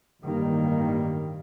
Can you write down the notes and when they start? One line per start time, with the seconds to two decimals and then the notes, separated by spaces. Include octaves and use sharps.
0.23 A1 G2 D#3 G3 A#3